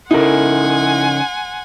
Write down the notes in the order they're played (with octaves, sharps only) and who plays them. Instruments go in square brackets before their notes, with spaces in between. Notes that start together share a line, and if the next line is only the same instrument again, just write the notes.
[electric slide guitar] C#3 D#4 [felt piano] E4 A4 A#4 [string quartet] F#5 G#5 C6